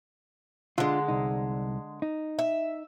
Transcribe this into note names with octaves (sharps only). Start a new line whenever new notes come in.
D3 G#3 D4 F4
C2 D#4
D#4
E5